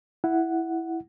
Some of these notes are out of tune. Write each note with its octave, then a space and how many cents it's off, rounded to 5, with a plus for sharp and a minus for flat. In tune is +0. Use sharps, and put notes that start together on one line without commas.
E4 +0 F#5 +0